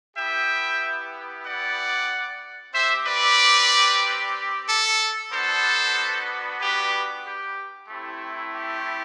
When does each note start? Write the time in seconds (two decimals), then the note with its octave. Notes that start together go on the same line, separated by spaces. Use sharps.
0.17 B3 E4 G4 E5 G5
1.46 D5 F#5
2.74 C4 G4 C5 E5
3.07 B4 D5
4.68 A4
5.32 B3 D4 F#4 A4 C5
6.61 G4 B4
7.25 G4
7.89 A3 C4 E4 G4
8.53 G4